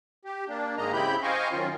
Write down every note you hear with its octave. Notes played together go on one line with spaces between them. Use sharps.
G4
A#3 D4
G#2 D#3 G#3 A#3 D#5 A#5
C#3 C4 E4 G4 B5 G6
C5 D#5 F5 G5 G#5 C#6
F#2 D#3 C#4 F4